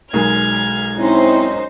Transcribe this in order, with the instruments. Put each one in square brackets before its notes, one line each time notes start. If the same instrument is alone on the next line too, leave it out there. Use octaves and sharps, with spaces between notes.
[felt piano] B1 G#3 A#4 [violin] F6 G#6
[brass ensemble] C4 E4 [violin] C#4 [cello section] D#4 C5